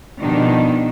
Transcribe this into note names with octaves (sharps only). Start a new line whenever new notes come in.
B2 D#3 F3 D4 D#4 G4